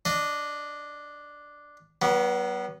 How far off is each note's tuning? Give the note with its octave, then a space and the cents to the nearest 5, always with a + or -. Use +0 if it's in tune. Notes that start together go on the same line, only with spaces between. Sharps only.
D4 +0 D#5 -15
F#3 +40 B3 -20